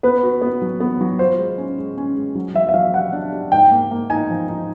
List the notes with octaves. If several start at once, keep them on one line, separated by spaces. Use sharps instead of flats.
B3 B4
F#4
B3
F#3
B3
F#3
F4 C5
G#3
C#4
G#3
C#4
G#3
F#3
F#3 E5
E5
F#3 F5
G4 F#5
D4
G4
G#2 G5
A#3
A#3
D#4 G#5
F3
D#4